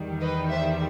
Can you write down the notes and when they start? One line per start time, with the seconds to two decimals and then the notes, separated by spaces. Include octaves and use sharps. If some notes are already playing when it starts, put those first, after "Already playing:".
Already playing: E2 D#3 G3
0.21 B4 D#5
0.51 C5 E5